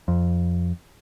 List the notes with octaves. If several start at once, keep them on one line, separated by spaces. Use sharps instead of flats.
F2